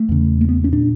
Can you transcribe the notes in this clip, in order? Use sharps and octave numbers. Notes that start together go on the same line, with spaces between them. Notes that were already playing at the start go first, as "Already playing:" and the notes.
Already playing: A3
E2 C#3
A#3
B3
C#4
A#2 D4